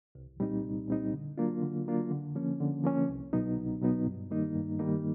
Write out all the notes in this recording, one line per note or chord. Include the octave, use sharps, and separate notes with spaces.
C2
A#2 G3 C4 D#4
C2
A#2 G3 C4 D#4
D3
F#3 A#3 D4 F4
D3
F#3 A#3 D4 F4
D3
F3 A#3 C#4
D3
F3 A#3 C#4
C2
B2 F#3 B3 D#4
C2
B2 F#3 B3 D#4
G2
D#3 G3 A#3 D#4
G2
D#3 G3 A#3 D#4